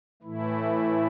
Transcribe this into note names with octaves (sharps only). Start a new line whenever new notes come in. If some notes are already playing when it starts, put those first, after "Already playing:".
A2 E3 A3 E4